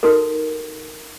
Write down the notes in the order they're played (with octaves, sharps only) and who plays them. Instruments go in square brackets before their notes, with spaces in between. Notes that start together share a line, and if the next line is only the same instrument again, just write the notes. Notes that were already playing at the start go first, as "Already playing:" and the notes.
[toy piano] D#4 F#4 A4 A#4